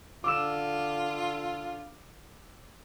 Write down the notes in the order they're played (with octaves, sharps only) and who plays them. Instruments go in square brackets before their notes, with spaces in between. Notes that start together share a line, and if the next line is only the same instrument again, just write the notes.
[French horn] D3 [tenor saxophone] F4 [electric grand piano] D6 E6 E7